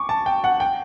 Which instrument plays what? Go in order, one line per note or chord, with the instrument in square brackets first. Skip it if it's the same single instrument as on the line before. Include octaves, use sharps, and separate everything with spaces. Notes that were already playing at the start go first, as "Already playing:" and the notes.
Already playing: [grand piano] C#6 D6
A5
G5
F#5
G5